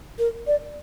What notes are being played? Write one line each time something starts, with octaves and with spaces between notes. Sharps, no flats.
A#4
D5